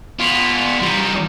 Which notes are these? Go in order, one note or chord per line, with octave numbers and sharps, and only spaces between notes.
B3 F4
G3 D#4